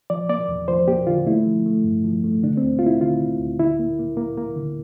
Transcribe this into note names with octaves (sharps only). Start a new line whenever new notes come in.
F3 D5
A#3 D5
E2
F3 C5
A#3 G4
D3 F4
A3 E4
F3
A3
G2
F3
A3
D3 D4
C4
D2
F4
A#3 E4
D3 F4
D3
D2
D3 E4
A#3
A#3
A#3
A#3
D3